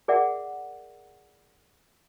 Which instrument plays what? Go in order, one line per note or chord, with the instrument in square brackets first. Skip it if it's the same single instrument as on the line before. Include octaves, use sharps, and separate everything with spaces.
[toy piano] G#4 A#4 D5 E5 F#5